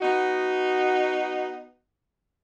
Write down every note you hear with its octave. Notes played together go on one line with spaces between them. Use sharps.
B3 D#4 F#4